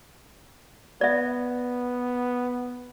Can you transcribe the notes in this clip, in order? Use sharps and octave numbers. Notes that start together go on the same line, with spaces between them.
B3 D5 E5